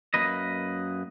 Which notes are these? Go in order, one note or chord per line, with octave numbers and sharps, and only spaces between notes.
F#2 A#3 B4 D#5